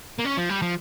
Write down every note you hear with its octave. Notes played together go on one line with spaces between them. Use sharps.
A#3
C#4
F3
G3
F3